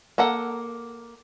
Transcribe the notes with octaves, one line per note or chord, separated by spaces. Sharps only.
A#3 A4 F#5